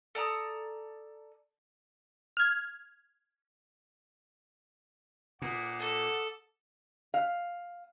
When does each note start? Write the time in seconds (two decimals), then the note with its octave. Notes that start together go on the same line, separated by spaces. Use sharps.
0.15 A4 D5 A#5 D#6
2.37 F6 G#6
5.42 A#2 F#5 D6 D#6
5.79 A4
7.14 F5